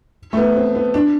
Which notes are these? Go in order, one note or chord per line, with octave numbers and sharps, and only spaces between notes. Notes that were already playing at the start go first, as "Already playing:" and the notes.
A3
B3
C4
B3
D4